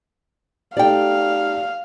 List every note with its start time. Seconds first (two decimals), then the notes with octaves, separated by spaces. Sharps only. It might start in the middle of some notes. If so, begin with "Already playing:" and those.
0.77 A3 D#4 G4 D5 F5 G5